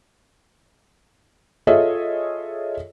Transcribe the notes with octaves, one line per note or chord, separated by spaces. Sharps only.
F4 G#4 A4 C#5 D#5 E5